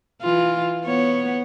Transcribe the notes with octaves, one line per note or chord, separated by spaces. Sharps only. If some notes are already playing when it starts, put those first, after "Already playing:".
E3 F4
B3 C#5